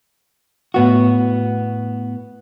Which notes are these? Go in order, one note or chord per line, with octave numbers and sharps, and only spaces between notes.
A2 B3 F#4